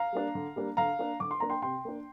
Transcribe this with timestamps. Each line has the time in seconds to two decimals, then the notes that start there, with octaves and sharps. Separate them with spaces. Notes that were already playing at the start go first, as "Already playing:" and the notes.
Already playing: F5 A#5
0.13 G3 A#3 D4
0.35 D3
0.56 G3 A#3 D4
0.77 D3 F5 A#5
0.99 A#3 D4
1.20 D3 D6
1.31 C6
1.40 A#3 D4 A#5
1.50 G5 C6
1.62 C3 G5 C6
1.85 A#3 D4